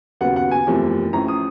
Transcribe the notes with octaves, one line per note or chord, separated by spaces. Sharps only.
D#2 C#3 F#3 B3 F#5
F#5
G#5
F#1 E2 C3 F3 A3
A1 A2 F3 A3 C#4 A#5
D#6